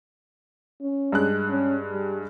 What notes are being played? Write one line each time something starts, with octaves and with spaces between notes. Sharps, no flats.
C#4
G2 G#3 F#6
C#4
G3